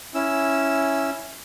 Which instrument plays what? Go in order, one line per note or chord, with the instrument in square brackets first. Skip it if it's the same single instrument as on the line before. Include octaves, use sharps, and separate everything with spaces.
[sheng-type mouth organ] C#4 E4 E6